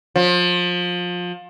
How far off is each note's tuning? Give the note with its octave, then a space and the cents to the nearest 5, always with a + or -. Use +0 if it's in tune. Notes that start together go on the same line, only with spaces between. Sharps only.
F3 +25